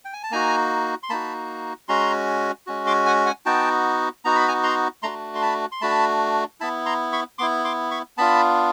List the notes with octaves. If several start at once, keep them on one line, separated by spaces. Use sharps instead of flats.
G5
G#5
A5
A#3 D#4 F#4 G#5 A#5
C6
A#3 D#4 F#4 A5 B5
G#3 C#4 F#4 A#5 C6
G#3 C#4 F#4
C6 D6
F#5 G#5
F#5 G#5
B3 D#4 F#4 G5 A5
B3 D#4 F#4 A#5
B5
G#5 A#5
A#5 C6
A3 D4 F#4 A#5 C6
C6
A5 B5
C6
A3 D4 F#4 A5 B5
B3 E4 A5 B5
A#5 C6
B5 C#6
B3 E4 C6 D6
C6 D6
B5 C#6
B3 D4 F4 A5 B5